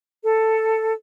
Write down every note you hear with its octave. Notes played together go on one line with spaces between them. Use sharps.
A4